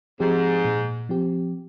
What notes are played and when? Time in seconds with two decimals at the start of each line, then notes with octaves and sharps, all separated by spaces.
0.20 G#2 F3 C4 G4
0.65 A#2
1.09 F3 C4 G4